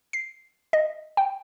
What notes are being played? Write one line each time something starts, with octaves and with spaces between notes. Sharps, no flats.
C7
D#5
G5